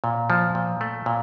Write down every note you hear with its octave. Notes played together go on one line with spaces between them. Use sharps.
A#2
F3
A#2
A3
A#2